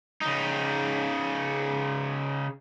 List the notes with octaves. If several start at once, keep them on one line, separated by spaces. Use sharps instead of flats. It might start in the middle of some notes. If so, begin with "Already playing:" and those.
C#3 D#4